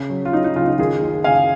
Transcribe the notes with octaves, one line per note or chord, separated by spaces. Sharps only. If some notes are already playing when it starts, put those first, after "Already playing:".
Already playing: C#3
F#3
F4
F#3 D#4
D#4
C#2 F4
D#4
D#3 F4 G#4
F#1
F#1 F5 G#5